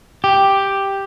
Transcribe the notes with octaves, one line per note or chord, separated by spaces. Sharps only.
G4